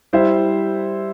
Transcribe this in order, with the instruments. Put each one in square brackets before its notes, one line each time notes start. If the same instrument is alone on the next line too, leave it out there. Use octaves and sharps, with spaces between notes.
[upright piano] G3 E4 C5 E5